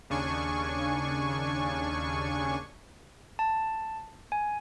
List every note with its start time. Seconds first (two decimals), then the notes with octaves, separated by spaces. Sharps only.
0.10 D#2 C#3 D4 G#5 C#6
3.39 A5
4.32 G#5